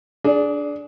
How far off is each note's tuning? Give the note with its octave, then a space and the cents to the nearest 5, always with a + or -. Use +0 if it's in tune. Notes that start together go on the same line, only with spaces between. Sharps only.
D4 -10 G#4 +20